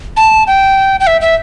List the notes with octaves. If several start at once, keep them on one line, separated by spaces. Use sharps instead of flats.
A5
G5
G5
E5
E5